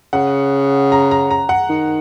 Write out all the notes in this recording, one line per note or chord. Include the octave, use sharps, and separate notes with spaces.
C#3 F#5
A#5
A#5
A#5
F#5
D#3